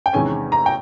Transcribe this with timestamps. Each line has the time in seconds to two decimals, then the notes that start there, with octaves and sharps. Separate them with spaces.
0.06 G5
0.13 E2 C3 D#3 G#3 C#4 G#5
0.52 A#5
0.66 G5